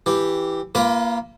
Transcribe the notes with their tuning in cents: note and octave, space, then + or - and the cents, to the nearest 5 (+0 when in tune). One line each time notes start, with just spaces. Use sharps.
E3 +0 G4 +0
A#3 +10 F4 -35 B4 +0